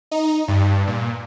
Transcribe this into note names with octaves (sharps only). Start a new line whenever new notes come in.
D#4
G2
A#2